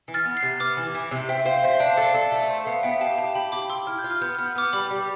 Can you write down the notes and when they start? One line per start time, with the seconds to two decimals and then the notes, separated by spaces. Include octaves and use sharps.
0.08 E3
0.14 F6 A6
0.25 B3
0.37 A6 C7
0.43 C3
0.60 B3 D6 F6
0.77 E3
0.95 E3
1.11 C3
1.29 C5 E5 G5
1.45 C5 F5
1.58 F5
1.64 C5 E5
1.80 D4 F5
1.97 A4 F5
2.14 A4
2.32 A3 E5
2.49 C5
2.66 B3 F5
2.83 B3 E5 G5
3.01 G4 F5 A5
3.18 G4 F5 A5
3.35 G4 G5 B5
3.52 G4 B5 D6
3.70 G4 C6 E6
3.87 E4 F6
3.99 G6
4.04 F4
4.11 F6
4.21 B3 G6
4.35 B3 F6
4.46 G6
4.56 B3 D6 F6
4.73 G3 B5 D6
4.91 G3